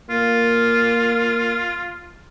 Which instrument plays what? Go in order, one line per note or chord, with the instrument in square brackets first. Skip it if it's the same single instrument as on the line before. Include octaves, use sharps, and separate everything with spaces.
[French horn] A#3 [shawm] F4